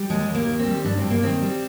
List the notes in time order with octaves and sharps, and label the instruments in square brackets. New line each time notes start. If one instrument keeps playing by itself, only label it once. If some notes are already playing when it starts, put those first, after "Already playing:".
Already playing: [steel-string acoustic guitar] G3
D#2 G#3
D#2
A#3
D#3
C4
G3
G2 D4
C4
G2
A#3
D#3 C4
G3